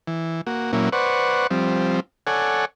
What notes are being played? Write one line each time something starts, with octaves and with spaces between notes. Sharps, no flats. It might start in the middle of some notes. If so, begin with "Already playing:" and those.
E3
A#3 F#4
A#2 F#3 A#3 C#4 E4
B4 C5 D5 F#5 C#6
F3 G3 C4
A4 C#5 D5 F#5 G#5